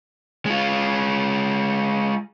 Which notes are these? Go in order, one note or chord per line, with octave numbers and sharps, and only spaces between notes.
G#3 F4